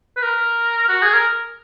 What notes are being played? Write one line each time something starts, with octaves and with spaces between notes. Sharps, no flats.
B4
A#4
F#4
G#4
A#4